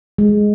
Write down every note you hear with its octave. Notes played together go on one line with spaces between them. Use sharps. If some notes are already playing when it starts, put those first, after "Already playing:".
G#3